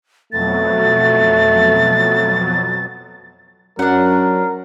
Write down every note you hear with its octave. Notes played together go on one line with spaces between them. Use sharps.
F2 B2 F#3 A3 A6
F#2 F#3 D4 A#4 F#5